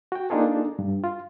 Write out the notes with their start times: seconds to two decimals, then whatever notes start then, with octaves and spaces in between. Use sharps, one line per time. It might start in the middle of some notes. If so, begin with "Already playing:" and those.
0.12 F#4 G5
0.30 A#3 D4 D#4 F4 G#4 A4
0.79 G2
1.04 F4